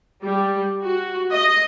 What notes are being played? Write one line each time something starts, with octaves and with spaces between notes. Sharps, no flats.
G3
F#4
D#5